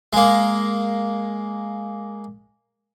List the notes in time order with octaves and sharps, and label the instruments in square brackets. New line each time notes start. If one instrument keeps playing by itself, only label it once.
[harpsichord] G#3 A#3